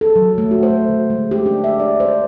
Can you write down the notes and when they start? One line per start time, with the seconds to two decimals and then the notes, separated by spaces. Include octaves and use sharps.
0.01 A4
0.16 F#3
0.38 A3
0.51 F#4
0.63 C5
0.88 D3
1.10 G#3
1.31 G4
1.46 D4
1.64 E5
1.80 D5
2.00 C5